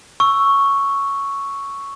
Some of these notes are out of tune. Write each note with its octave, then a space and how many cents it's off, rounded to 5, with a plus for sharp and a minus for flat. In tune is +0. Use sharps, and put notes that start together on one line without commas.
C#6 +0 E6 +0